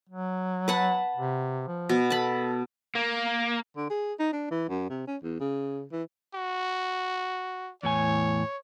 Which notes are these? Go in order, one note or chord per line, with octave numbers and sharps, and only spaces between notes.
F#3
B4 F#5 A5
C3
F3
B2 B3
A4 A5 B5
A#3
D3
G#4
D#4
D4
E3
F#2
C3
C#4
E2
C#3
E3
F#4
E2 A2 C#5 G#5